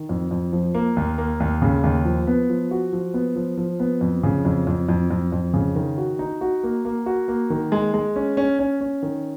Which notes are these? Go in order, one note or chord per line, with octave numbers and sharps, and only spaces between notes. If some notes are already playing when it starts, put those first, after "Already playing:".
Already playing: D#3
F2
F2
F3
A#3
D#2
A#3
D#2
C#3
D#2
F3
B3
F3
F#4
F3
B3
F3
F3
B3
F2
C#3
F2
F2
F2
F2
F2
C#3
D#3
F#4
D#4
F#4
A#3
A#3
F#4
A#3
D#3
G#3
G#3
C#4
C#4
C#4
C#4
D#3